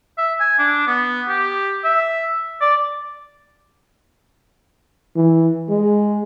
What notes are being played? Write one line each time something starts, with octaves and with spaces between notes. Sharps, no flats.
E5
G#5
D4
B3
G4
E5
D5
E3
G#3